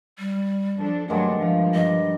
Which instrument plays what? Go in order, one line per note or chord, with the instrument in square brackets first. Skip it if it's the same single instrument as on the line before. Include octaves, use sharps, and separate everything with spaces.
[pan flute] G3
[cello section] F3 D4 A4
[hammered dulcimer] G2 D#3 G#3 [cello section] F#3 A3 D4 [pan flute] F#5
[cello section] F3 [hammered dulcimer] F5
[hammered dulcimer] G2 [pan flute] D#5